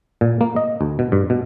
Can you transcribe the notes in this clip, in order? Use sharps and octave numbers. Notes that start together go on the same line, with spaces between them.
A#2
A#3
D#5
D2
B2
G2
B2